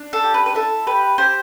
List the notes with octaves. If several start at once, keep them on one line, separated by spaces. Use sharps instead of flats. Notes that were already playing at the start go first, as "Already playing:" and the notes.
Already playing: D4
A4
G4
B4
B4
E4 A4
G4 B4
G4 C5